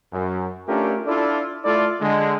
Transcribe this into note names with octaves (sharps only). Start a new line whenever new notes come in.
F#2
A3 C#4 D4 F4 G4 A#4
D4 E4 F4 A4 D5
A3 E4 F4 A4 D5
D3 G#3